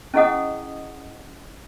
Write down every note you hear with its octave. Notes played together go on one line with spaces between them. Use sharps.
C#4 E4 G#4 D#5 F#5 D#6